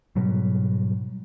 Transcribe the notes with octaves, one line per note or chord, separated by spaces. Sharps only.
G#2 B2 F#3 G3